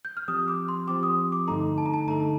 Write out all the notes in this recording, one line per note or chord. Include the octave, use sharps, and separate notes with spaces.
G6
F6
F3 C4 G4 D#6
D6
C6
F3 C4 G4 D6
D#6
D6
G2 D3 A3 D#4 A4 A#5
A5
A#5
A5
G2 D3 A3 D#4 A4 A#5